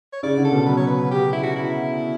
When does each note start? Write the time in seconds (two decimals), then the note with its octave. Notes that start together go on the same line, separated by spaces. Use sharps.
0.13 C#5
0.23 C#3 D5
0.38 D3
0.45 A4
0.52 B2
0.66 F#3 B4
0.77 C#5
0.87 B4
1.11 G4
1.33 E4
1.44 F#4
1.56 E4